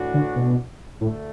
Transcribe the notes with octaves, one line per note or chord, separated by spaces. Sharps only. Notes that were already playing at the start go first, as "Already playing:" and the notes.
Already playing: A2 E3 D4 F#4
D3
B2
D2 A2 D3 A3